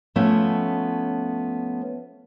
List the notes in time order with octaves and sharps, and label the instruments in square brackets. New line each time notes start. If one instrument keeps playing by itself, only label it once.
[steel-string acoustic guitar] F3 A3 B3 C#4